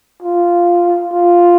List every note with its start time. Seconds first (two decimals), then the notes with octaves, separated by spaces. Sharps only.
0.22 F4
1.13 F4